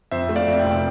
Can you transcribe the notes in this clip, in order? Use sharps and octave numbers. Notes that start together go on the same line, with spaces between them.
F2 C5 E5
A3
D5 F5
F2
E5 G5
F1